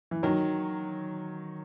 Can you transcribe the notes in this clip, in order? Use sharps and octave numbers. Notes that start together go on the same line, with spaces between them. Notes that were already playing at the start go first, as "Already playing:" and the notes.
E3
D#3 F#3